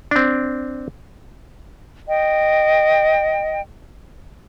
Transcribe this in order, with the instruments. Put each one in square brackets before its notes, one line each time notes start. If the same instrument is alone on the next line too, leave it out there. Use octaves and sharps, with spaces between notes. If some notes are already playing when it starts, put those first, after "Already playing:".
[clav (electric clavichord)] C4 D4
[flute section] D#5 G5